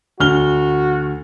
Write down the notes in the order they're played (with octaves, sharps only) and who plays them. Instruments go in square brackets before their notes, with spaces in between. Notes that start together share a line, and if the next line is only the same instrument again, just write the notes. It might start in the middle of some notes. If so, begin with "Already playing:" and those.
[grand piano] D2 F6 G7 [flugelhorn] F#4